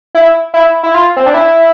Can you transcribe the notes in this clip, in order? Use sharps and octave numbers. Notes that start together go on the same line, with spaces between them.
E4
E4
E4
F4
C4
D4
E4